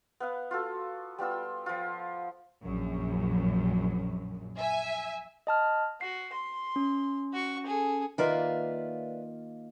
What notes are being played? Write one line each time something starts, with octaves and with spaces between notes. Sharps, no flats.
B3 F5 F#5
F4 F#4 A4
G3 B3 F4 E6
F3 F4
A#1 F#2
E5 G#5
D#5 A5 F6
F#4 C7
C6
C#4
F#4 C#6
G#4 A4
D#3 A#3 F4 B4 D5 E5